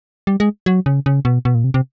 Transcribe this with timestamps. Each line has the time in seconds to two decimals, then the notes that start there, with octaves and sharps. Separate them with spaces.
0.27 G3
0.40 G#3
0.66 F#3
0.86 C#3
1.06 C#3
1.25 B2
1.45 B2
1.55 A#2
1.64 C3
1.74 C3